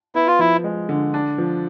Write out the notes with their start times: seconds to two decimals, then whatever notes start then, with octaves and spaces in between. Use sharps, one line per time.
0.14 B3 E4
0.27 F4
0.39 F3 E4
0.64 G#3
0.89 D3
1.14 D4
1.38 F3